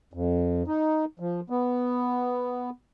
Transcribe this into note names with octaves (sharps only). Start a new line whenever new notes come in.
F2
D#4
F3
B3